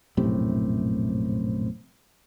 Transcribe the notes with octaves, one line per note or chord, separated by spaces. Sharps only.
A#1 F#2 A2 C3